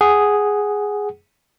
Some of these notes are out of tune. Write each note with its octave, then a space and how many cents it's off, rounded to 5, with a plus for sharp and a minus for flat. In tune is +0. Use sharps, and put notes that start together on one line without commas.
G#4 +0 F#5 +10